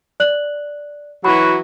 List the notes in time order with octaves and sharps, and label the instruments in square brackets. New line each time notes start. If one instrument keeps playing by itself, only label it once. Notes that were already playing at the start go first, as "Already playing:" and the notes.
[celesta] D5 F#6 F#7
[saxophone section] E3 F#3 F#4 [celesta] B5